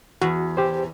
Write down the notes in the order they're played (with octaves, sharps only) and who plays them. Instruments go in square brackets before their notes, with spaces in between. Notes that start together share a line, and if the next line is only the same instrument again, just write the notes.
[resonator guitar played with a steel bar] E2 [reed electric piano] F#4
[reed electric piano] G4 C5